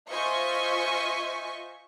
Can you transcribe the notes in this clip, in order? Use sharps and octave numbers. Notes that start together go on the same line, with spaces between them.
F4 C5 D#5 E5 G#5 C#6